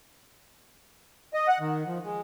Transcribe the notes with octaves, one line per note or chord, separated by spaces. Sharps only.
D#5
F#5
D#3
F3
G#3